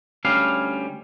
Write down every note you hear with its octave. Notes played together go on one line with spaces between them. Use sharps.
D2 G3 C#4 F5